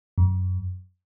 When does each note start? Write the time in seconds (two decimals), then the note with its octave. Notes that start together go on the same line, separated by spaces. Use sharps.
0.18 F#2